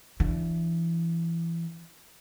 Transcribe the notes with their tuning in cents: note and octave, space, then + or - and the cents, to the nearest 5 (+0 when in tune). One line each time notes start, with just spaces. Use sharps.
E3 +20 D4 +0